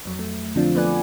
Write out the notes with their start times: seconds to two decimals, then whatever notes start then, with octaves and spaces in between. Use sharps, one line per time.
0.05 F2 F#3
0.19 A3
0.55 D3 F3 C4 D4 F4
0.75 A3 B3 B4 D5 F#5 G#5